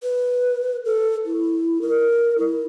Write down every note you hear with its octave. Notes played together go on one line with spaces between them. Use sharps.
B4
A4
E4
A#4
E4